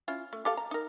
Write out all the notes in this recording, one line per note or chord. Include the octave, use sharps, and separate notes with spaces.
C#4 E4 F4
A3
G4 A4 F5
A#5
D#4 A#4